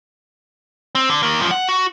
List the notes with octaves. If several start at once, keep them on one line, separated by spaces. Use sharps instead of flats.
C4
D3
D#3 A#3
F#2 F3
F#5
F#4